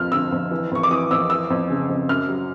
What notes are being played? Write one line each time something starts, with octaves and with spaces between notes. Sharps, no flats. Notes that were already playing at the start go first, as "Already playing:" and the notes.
Already playing: F2 F3 F6
D3 E6
F2
E3
F2 C#6
D6
E3 D#6
F2 E6
E3 E6
F2
C#3
F2
F#2 F6
F#3